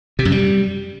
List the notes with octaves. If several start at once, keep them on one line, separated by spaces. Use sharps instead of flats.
C3
F#2
G3